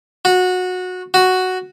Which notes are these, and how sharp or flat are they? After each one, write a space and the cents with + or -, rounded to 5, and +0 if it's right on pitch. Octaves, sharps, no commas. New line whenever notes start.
F#4 -20
F#4 +0